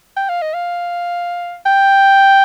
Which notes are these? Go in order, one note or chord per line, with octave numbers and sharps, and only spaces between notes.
G5
F5
D#5
F5
G5